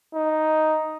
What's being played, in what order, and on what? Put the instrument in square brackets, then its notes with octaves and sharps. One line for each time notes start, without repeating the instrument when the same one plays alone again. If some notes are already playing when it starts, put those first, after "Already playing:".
[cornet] D#4